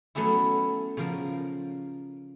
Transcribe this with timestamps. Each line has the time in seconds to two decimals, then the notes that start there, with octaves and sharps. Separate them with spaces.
0.15 F#3 A3 B3 C#4 E4
0.97 C#3 F3 A#4